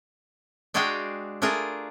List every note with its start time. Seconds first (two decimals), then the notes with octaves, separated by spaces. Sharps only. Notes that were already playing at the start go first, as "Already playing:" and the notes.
0.74 G#3 D4 F#4 G#4 F5 G5
1.42 A3 D4 F4 G#4 A#4